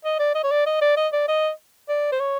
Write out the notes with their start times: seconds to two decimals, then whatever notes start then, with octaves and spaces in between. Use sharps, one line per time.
0.05 D#5
0.19 D5
0.35 D#5
0.44 C#5
0.51 D5
0.66 D#5
0.81 D5
0.97 D#5
1.13 D5
1.28 D#5
1.89 D5
2.12 C5
2.20 C#5